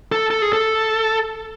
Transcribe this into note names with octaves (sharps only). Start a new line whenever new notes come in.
A4
A4
G#4
A4